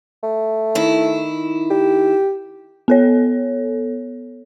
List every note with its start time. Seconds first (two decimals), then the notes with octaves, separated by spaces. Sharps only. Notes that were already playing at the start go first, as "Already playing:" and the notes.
0.23 A3
0.75 D#3 E4
1.70 G4
2.88 B3 A4 C#5